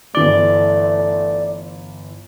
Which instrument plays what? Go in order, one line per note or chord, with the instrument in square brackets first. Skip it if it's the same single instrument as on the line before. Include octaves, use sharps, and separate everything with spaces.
[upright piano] G1 E3 G7 [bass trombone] A3 [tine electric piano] D5